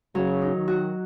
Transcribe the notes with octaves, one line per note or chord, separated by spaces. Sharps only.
C#3 F#3
D#4
D#3
F#4